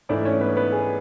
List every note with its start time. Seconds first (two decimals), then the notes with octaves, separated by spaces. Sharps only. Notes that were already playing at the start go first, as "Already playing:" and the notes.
0.09 G#2 E3 A3 D4 E4 D5
0.25 C#4 C#5
0.41 B3 B4
0.56 B3 B4
0.72 G#4